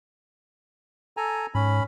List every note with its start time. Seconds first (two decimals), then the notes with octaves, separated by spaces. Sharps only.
1.17 A4 G#5 A#5
1.55 G#2 C#4 B5